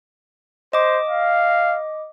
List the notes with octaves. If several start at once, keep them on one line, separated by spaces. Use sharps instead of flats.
C5 D#5 D6
F5